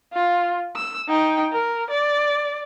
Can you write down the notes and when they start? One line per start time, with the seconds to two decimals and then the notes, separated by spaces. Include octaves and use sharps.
0.13 F4
0.76 E6
1.08 D#4 G5
1.52 A#4
1.90 D5